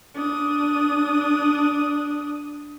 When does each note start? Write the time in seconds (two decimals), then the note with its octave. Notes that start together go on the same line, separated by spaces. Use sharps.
0.15 D4 D#6